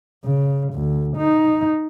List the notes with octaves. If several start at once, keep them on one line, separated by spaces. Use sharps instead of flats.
C#3
D2
D#4